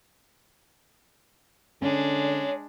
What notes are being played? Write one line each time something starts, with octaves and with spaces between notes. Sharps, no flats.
D3 G#3 C#4 D4 C#5